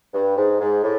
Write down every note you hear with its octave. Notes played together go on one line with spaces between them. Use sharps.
G2
G#2
G#2
A2